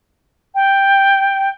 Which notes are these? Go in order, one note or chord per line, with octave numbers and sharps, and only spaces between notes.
G5